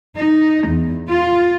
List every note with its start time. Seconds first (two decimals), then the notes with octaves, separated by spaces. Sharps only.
0.18 D#4
0.69 E2
1.10 F4